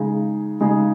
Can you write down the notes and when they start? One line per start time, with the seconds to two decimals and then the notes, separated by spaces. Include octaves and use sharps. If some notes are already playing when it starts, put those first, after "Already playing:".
Already playing: C#3 G#3 D#4 G#4
0.61 C#3 G#3 D#4 G#4